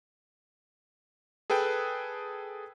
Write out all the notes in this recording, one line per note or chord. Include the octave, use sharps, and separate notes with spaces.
G#4 A4 B4 G5